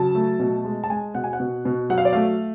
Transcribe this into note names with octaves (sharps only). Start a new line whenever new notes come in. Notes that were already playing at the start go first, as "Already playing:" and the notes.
Already playing: C#3 F#3 A5
A3
B2
G#3
A5
G#3 G#5
B2 F#5
G#5
F#5
B2
B2
F#3 F#5
F5
D5
A3 F5